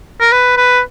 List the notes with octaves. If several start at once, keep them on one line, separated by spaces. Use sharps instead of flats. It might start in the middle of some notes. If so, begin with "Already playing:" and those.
A#4
B4
B4